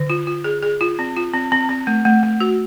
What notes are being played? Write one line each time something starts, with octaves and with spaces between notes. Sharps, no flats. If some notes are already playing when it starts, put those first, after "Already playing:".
Already playing: D3
F4
F4
G#4
G#4
F4
C4
F4
C4
C4
C4
A3
A3
A3
F#4